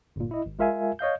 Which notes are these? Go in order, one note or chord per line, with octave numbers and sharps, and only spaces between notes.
G1 A#2
E4 D#5
G#1
G#3 F4 A#4 E5 F5 G#5
C#5 D#5 F5 G6